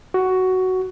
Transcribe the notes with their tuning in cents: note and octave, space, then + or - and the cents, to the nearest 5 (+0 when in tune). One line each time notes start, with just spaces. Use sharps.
F#4 +10